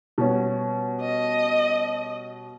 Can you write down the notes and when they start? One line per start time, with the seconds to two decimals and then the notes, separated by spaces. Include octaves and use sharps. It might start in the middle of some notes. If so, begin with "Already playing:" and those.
0.18 B2 G3 C#4
1.01 D#5